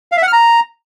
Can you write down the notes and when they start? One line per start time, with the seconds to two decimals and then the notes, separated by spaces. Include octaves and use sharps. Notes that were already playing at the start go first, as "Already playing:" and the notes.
0.12 F5
0.17 E5
0.22 F#5
0.27 F6
0.33 A#5